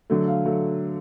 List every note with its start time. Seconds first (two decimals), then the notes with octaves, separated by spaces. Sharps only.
0.10 D3 F#3 A3
0.27 F5
0.45 F#3 A3